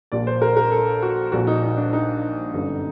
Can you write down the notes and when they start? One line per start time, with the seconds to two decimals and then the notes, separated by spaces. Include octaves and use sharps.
0.12 A#1 A#2 D5
0.27 C5
0.42 A#4
0.57 A#4
0.71 A4
1.02 F#4
1.32 A#1 A#2 F#4
1.47 D#4
1.63 D#4
1.77 D4
1.93 D#4
2.53 G1 F#2 D3